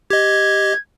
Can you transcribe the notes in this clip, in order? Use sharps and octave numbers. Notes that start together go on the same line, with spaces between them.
G4 D#5 G#6